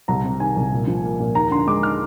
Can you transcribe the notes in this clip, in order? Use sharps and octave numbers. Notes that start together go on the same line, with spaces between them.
C2 A#5
C3
D#3 G#5
C2
A#2
F3
A#3
A#2
D#2 A#5
D3 C6
G#3 D6
D#4 F6